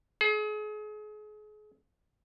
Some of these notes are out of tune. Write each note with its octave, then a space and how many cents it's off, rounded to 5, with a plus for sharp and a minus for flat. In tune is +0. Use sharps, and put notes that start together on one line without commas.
G#4 +35